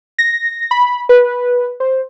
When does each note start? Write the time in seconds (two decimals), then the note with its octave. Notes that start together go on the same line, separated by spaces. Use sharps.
0.19 A#6
0.71 B5
1.09 B4
1.80 C5